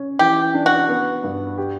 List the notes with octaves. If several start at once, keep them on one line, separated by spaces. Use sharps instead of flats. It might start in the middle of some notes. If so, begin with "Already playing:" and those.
Already playing: C#4
E3 G4
D4
F#4
B3
G2
G4